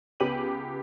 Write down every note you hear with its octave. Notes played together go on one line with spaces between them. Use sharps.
C#2 B3 G4 D6 D#7 F#7